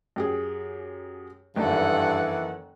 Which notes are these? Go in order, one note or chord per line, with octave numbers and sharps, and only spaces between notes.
F#2 G4 G#4
F#1 G2 D#3 E3 A4 F#5